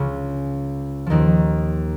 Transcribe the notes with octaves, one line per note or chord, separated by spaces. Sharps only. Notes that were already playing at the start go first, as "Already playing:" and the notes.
Already playing: C#2 C#3
D#2 D#3 F3